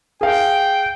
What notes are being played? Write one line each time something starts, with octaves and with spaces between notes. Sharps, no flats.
G#4 F5 G5